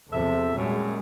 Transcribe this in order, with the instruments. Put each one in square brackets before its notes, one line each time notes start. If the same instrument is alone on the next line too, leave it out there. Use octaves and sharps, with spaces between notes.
[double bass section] E2 C3 F3 [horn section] A4 E5
[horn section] F#2 [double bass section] A#2 G3 G#3